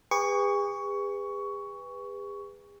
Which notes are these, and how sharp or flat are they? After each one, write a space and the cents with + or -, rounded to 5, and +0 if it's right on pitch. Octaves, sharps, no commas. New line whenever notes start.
G#4 -40 B4 +0 C#6 +15